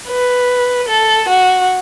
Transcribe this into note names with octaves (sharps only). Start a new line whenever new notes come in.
B4
A4
F#4